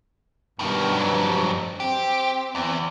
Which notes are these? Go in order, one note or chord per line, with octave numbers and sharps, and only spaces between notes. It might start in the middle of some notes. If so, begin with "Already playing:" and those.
G2 B2 D#3
F2 F#3
C4 G4
E2